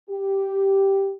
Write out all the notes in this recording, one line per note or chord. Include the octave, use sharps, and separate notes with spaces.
G4